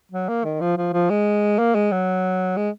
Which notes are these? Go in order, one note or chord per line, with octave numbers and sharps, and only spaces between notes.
F#3
A#3
D#3
F3
F3
F3
G#3
A#3
G#3
F#3
G#3